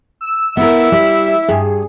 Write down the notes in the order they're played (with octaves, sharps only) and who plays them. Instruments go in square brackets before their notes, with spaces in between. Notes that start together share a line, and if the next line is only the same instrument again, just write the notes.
[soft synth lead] E6
[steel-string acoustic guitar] B3 A#4 [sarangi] E4
[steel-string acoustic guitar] G3 [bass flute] E5
[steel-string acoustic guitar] G2 [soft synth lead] G#4